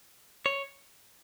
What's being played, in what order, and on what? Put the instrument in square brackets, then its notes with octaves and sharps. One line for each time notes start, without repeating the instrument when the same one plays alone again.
[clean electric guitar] C#5